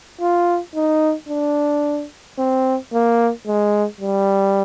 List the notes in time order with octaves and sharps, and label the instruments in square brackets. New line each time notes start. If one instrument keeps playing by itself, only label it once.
[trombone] F4
D#4
D4
C4
A#3
G#3
G3